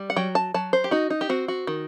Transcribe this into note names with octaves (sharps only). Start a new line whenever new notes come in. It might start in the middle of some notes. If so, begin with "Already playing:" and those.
Already playing: G3
F#5
F#3 G5
A5
F#3 A5
C5
G4
D#4 F#4
D#4
G4
C4 F#4
F#4
D#3